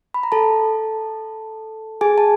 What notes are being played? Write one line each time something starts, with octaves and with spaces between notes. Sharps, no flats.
B5
A#5
A4 A5
G#4 G#5
A5